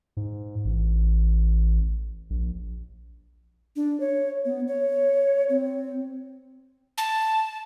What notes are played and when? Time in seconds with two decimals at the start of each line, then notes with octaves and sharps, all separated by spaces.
0.17 G#2
0.65 A1
2.30 A#1
3.76 D4
4.00 C#5
4.45 B3
4.68 C#5
5.49 C4
6.98 A5